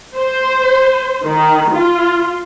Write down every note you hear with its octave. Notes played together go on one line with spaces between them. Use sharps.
C5
D#3
F4